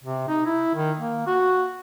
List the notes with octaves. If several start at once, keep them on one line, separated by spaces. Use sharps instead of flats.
C3
D#4
E4
D#3
A#3
F#4